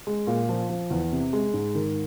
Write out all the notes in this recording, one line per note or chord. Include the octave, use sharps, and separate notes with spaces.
G#3
A#2
F3
F3
E2
C3
G#3
G#2
D#3